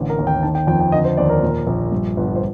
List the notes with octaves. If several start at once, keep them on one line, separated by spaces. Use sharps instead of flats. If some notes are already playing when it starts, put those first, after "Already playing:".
Already playing: A1 D3
A#4
D#2
G5
D#3 A5
G5
F2 G5
G5
D3 D#5
C5
D#2 D5
A#4
A#2
A#1
G2
G1
C5